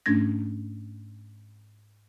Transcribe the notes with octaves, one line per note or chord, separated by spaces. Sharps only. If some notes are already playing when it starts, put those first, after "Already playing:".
G#2 A3 C#4 D4 G#6 A#6